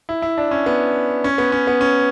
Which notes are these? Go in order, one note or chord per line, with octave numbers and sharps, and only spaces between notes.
E4
E4
D4
C#4
B3
C#4
B3
C#4
B3
C#4